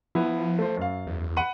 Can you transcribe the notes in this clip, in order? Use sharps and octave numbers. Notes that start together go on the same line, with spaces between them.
F3 B3 E4
A3 C5
F#2 F5
E2
F#5 B5 D#7